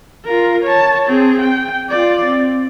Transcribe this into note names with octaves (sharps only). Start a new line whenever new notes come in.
F4 A#4
C#5 A5
C4 G#4
G5
F4 D5
C4